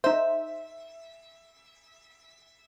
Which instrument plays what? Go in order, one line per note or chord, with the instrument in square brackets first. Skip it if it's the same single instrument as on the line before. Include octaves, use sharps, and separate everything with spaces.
[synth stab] D#4 C5 [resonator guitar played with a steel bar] E5